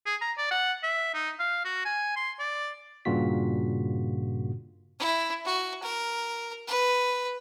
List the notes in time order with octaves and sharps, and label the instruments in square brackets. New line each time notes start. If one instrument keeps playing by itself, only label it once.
[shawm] G#4
A#5
D5
F#5
E5
D#4
F5
F#4
G#5
C6
D5
[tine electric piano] G2 A#2 C#3 F4 F#4 B6
[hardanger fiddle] E4
F#4
A#4
B4